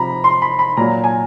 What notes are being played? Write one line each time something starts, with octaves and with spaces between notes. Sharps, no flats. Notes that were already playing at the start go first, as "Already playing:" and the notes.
Already playing: C3 F3 A#5 B5
C6
B5
B5
A#2 F#3 A#5
G#5